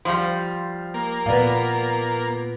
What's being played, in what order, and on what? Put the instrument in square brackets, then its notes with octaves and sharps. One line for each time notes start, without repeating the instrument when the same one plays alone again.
[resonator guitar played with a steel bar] F3 G3 [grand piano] C5 F5 C6
[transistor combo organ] A#3
[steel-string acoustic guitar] A#2 B3 [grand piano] B4 D5 F5